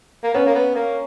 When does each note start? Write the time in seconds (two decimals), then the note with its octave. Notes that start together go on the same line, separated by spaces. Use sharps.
0.23 A#3
0.34 B3 C#4
0.46 A#3
0.55 B3
0.75 A#3